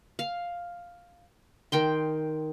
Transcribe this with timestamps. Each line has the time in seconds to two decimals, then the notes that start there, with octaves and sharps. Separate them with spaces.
0.19 F5
1.72 D#3 G5 C6